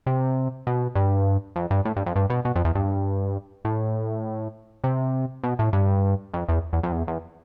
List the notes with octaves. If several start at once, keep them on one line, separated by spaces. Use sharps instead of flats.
C3
B2
G2
F2
G2
A2
G2
F2
G2
B2
B2
F2
E2
G2
A2
C3
B2
A2
G2
F2
E2
E2
F2
E2
E2